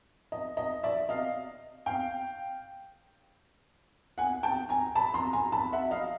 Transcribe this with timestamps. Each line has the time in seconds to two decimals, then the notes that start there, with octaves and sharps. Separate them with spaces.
0.32 D#5
0.57 D#5
0.83 D5 E5
1.09 D#5 F5
1.86 F5 G5
4.18 F#5 G#5
4.43 G5 A5
4.69 G#5 A#5
4.96 A5 B5
5.14 A#5 C6
5.33 G#5 A#5
5.52 A5 B5
5.73 E5 F#5
5.91 D#5 F5